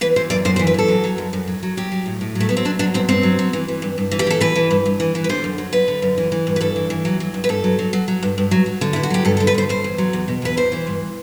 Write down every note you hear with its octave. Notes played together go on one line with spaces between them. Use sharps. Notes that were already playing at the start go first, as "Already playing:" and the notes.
E3 B4
E3 C5
F#2 D5
F#2 C5
C5
E3
B4
E3 A4
F#3
F#3
F#2
F#2
F#3
F#3
F#3 G4
F#3
A2
A2
F#3
A3
F#3 B3
C4
F#3 D4
F#3 D4
G2 C4
G2 C4
F#3
F#3
E3
E3
G2
G2
E3
G4
E3 A4
E3 B4
E3
G2
G2
E3
E3
B4
D3 C5
F#2
F#3
F#2 B4
D3
F#2
E3
E3
G2
B4
G2 A4
E3
E3
F#3
F#3
G2
B4
G2 A4
F#3
F#3
F#3
F#3
G2
G2
F#3
F#3
D3
G2 E4
F#4
F#3 G4
G2 A4
A4
D3
B4
G2 C5
B2 C5
E2
F#3
E2
B2
E2 B4
E3 C5
E3
G2